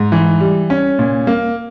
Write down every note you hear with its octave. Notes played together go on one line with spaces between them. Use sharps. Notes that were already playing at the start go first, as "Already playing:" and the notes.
Already playing: G#2
E3
G3
C#4
A#2
A#3